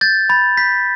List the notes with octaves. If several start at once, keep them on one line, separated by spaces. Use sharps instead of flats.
G6 A6
B5 A6
G6 B6